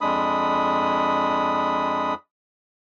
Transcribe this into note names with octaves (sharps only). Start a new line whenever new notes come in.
F2 G#3 D4 B5 D#6